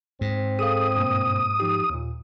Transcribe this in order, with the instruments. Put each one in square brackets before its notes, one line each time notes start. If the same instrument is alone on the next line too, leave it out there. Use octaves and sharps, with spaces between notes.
[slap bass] G#2 [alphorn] C4
[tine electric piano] G#4 A4 F5 [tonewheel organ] D#6
[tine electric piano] G2 B2 A#3
F3 D#4 G4
D#2 A#2